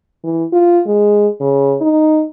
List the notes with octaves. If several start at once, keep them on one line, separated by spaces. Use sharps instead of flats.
E3
F4
G#3
C#3
D#4